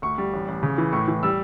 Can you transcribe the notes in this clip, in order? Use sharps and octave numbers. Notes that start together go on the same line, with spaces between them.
D2 C#6
G3
A1
A1
C#3
E3
A2 C#6
E3
G3 E6